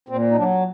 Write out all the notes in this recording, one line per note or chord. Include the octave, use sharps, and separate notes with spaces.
A#2 C4
D#4
F#3 D4